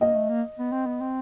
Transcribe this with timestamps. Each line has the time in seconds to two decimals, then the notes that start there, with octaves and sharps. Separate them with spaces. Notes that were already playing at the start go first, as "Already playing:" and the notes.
0.01 A#3 D#5
0.15 A3
0.29 A#3
0.59 B3
0.72 C4
0.86 B3
1.01 C4